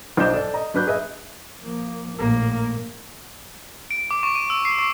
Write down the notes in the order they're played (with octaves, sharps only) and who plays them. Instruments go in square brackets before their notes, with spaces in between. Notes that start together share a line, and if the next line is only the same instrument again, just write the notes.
[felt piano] B1 D4 C5 D#5 G6 E7
A4 D5
D#5 A#5
F#3 D4 B4 F#6 G6
G#4 B4 D#5 E5
[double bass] F3 A#3
[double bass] A#1 A2 [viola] A#3
[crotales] D7
D6
C#6
D#7
E6
C7
C#6